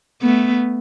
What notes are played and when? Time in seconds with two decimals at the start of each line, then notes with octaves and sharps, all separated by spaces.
0.22 A3 B3